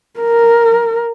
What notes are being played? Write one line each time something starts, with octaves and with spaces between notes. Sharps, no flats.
A#4